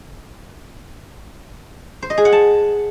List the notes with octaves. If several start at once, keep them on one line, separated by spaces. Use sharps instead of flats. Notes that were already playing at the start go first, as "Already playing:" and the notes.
C5
D#5
G#4
F#5
A5